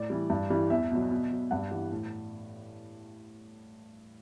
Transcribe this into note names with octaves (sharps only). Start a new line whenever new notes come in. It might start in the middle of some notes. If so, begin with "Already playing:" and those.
Already playing: A2 D5
E3 G3
G2
E3 G3
E2 E5
B2 F#3
B2
F#3
G2 F#5
E3 G3
A2